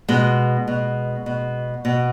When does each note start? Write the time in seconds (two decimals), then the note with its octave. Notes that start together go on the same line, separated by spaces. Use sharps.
0.08 B2 G#3
0.68 B2
1.26 B2
1.85 B2